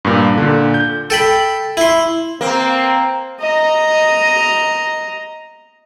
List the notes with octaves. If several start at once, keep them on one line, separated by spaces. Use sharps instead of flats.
G2 A#2
A#2 D3
G6
A4 G5 B5
E4 C6
A#3 C4
D#5 A#5